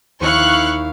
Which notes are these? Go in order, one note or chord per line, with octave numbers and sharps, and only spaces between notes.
D#2 E4 F5 C#6 F#6